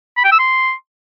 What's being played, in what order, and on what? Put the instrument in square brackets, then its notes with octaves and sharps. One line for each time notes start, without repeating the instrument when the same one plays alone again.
[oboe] B5
G5
E6
C6